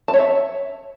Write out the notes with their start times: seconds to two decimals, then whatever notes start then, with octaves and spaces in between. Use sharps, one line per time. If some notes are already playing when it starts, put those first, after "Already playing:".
0.08 A5
0.14 C#5
0.19 E5